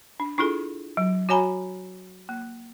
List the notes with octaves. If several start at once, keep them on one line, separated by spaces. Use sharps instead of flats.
D4
D4 E4 F4 G#4 A4
F#3
F#4 C#5 G#5 A#5 B5
A#3